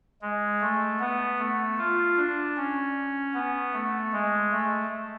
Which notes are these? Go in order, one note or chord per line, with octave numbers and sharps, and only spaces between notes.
G#3
A3
B3
A3
F4
D4
C#4
B3
A3
G#3
A3